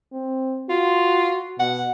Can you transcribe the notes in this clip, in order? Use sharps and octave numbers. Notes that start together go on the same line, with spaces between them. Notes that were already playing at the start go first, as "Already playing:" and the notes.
C4
F4 F#4
B2 F#5